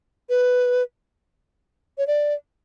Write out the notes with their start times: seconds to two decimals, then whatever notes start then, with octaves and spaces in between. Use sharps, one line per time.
0.29 B4
1.98 C#5
2.07 D5